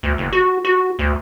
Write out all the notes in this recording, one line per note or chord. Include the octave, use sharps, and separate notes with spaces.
D2
F#1
F#4
F#4
D2